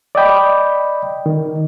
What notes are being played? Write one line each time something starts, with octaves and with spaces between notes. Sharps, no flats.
D5 D#5 G5 B5
D#3